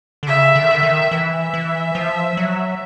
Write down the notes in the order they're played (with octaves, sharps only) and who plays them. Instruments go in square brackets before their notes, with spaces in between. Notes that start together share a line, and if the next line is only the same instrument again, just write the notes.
[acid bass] D3
[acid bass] C#3 [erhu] E5
[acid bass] D3
D#3
D3
D#3
[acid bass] E3 [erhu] E5
[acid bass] E3
F3
F#3